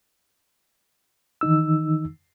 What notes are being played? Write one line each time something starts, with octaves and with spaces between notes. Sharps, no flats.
D#3 E3 D#4 E6